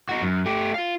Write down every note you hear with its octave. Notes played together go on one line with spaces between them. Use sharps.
D#4 F#4
F#2
A3 G4
F4 F5